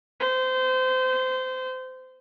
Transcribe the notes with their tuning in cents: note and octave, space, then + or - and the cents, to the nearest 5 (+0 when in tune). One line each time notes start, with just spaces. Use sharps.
C5 -25